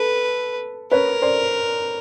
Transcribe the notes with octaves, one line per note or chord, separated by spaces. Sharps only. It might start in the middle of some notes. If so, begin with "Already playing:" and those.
Already playing: A4 B4
A#4 B4 C#5
C5 D5